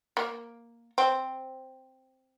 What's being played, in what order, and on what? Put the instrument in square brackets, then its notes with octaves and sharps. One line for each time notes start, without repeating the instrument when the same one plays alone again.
[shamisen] A#3
C4